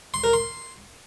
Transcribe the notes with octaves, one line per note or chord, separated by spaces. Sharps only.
C6
A#4
C6